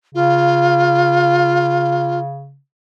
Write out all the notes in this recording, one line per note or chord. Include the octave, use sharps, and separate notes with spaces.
C#3 F4